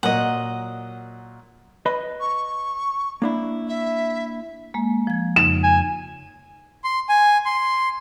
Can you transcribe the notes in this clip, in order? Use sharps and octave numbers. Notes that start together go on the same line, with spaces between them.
A#2 F#3 A#4 D#5 F#5
B4 D#5 B5
C#6
A#3 D4 E4
E5
G#3 A#3
F3 G#6
F2 C#3 D#4 E7
G#5
C6
G#5
C6